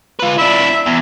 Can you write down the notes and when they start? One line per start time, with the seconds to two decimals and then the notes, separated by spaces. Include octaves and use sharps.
0.20 F4 B4
0.38 D4 E4 E5
0.87 E2